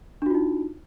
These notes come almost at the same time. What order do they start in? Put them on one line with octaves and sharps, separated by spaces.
D4 F#4 F4 D#4